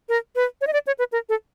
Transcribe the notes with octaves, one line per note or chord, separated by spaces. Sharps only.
A#4
B4
C#5
D#5
D5
C#5
B4
A#4
A4